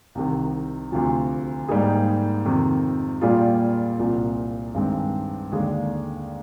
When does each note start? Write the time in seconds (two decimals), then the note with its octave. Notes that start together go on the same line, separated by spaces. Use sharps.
0.15 C2 C3 D#3
0.92 D2 C3 F3
1.69 G#2 G3 A#3 D#4 G#4
2.45 F2 C3 D#3
3.21 A#2 G3 A#3 F4 G#4
3.99 C2 A#2 F3
4.74 G2 D#3 G#3 C4
5.52 D#2 D3 G#3 D4 G#4